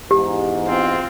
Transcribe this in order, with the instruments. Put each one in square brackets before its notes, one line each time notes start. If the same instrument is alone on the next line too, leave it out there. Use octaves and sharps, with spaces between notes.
[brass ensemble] E2 G#2 [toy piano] G4
[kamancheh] C4 F4